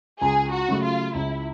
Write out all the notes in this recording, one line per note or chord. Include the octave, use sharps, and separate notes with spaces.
C#2 G#4
F#4
C#3 F#3 A3
F4
C#2 E4